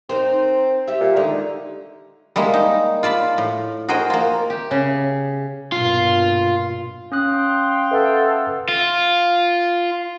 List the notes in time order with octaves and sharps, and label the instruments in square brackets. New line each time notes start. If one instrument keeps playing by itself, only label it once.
[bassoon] C4 [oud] D#4 A#4 C5
[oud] G3 G4 E5
[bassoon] A#2
[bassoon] D3 [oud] D#3 G#3 D#4
[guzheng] G3 G#3 A#3 E4
D#4
F4 D5 A5 B5
A2
F#4 G#4 A#4 C5 D#5 G5
A#3 F4
G4
C#3
[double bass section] B1 G2 A#2 [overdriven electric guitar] F4
[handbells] C#4 D#6 F#6 [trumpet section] F5 G5 C6
[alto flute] A4 [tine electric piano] B4 E5 F#5
[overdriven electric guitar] F4